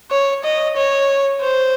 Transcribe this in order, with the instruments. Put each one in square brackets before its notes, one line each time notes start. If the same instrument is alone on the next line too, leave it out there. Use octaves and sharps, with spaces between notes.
[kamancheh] C#5
D#5
C#5
C5